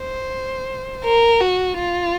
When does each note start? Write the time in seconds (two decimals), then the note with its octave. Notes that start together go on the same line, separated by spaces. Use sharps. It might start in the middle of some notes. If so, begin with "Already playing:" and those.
Already playing: C5
1.05 A#4
1.41 F#4
1.79 F4